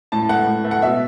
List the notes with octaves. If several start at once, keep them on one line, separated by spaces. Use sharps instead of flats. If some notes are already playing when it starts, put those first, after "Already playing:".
A2 A5
A3 F#5
A2
A3
F#5
B2 E5